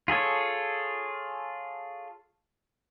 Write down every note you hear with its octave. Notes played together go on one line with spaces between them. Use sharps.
F4 G#4 A4 C#5